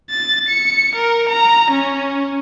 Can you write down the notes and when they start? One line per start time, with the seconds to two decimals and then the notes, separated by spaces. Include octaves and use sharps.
0.10 A6
0.49 C#7
0.95 A#4
1.29 A#5
1.71 C#4